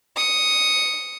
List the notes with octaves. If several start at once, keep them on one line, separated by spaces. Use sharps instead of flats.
D#6 C#7